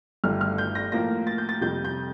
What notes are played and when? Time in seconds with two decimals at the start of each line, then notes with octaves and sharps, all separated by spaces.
0.24 G1 G2 D#3 A3 F6
0.41 F6
0.58 G6
0.75 A#6
0.92 A2 F3 A#3 A#6
1.27 A6
1.38 G6
1.49 A6
1.61 F2 C3 G3 G6
1.85 G6